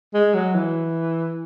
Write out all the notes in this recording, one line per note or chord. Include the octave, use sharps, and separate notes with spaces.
G#3
F#3
E3